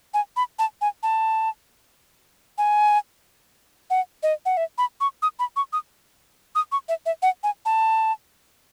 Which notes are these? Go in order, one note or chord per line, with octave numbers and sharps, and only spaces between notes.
G#5
B5
A5
G#5
A5
G#5
F#5
D#5
F#5
E5
B5
C#6
D#6
B5
C#6
D#6
D#6
C#6
E5
E5
F#5
G#5
A5